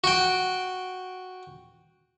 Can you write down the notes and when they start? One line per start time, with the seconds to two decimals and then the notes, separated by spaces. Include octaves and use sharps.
0.04 F#4 G5